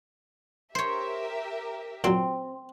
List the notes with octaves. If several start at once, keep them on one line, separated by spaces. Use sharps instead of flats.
G4 A#4 C5 C#5 E5
A#2 F#3 C4